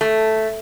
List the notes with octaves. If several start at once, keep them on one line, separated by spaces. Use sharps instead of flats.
A3